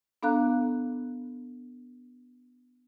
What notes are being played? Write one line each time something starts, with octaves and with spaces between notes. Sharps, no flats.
B3 D4 A4 F5 A#5 F#6